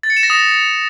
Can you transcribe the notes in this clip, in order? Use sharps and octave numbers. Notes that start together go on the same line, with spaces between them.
A6
C#7
E7
A#6
D#6